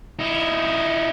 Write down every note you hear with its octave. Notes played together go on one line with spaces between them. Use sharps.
D#4 E4